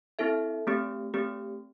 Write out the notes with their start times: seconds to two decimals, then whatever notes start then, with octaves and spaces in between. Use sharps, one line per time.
0.19 C4 E4 A4 E5
0.67 A3 C4 G4
1.14 A3 C4 G4